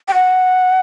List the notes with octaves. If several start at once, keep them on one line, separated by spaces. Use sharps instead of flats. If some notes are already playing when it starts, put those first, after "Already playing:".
G5
F#5